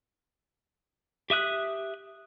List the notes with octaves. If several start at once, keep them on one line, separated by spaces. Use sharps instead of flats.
G4 E5 D#6 F#6